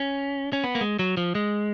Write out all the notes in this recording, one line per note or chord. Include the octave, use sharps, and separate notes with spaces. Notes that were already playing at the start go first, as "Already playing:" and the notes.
Already playing: C#4
C#4
B3
A#3
G#3
F#3
F3
G#3